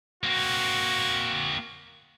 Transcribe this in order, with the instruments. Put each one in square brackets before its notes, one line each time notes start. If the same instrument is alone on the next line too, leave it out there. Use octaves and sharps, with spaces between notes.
[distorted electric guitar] A#3 C4 [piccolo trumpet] F#4